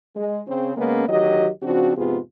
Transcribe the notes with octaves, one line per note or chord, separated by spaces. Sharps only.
G#3
C#3 C4
C#3 G#3 A#3 B3 C#4
D2 D#3 F#3 G4 D#5
C#3 F3 C4 D4 F#4
F2 G#2 C3 B3 F4 G#4